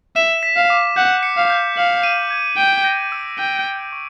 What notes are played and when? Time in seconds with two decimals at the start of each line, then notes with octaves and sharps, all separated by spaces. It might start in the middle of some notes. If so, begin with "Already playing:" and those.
0.16 E5 E7
0.43 B6
0.56 F5
0.70 D6
0.96 F#5 G6
1.23 C#7
1.37 F5
1.50 G6
1.77 F5 F#7
2.03 D#7
2.31 G#6
2.57 G5 D7
2.84 A#6
3.12 E6
3.38 G5 D7
3.65 A#6
3.92 C#6